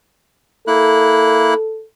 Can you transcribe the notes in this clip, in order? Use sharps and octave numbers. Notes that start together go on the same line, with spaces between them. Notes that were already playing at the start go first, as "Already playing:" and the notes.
A#3 E4 A4 F#6